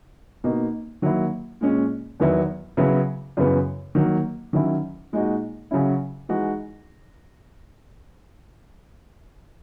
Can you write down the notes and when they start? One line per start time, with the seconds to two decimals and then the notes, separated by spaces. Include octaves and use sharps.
0.44 B2 A#3 D#4
1.02 D#3 F#3 A#3 E4
1.61 A#2 G#3 C#4
2.20 E2 D#3 F#3 B3 E4
2.77 C#3 F#3 B3 E4
3.37 F#2 C#3 E3 B3
3.95 D#3 F#3 A#3
4.53 D#3 F#3 C#4 E4
5.12 A#2 G#3 D#4 F#4
5.71 C#3 F#3 C#4 E4
6.29 E3 G#3 D#4 F#4